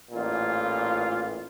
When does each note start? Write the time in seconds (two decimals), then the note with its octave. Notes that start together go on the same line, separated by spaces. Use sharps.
0.11 A1 A#2 F4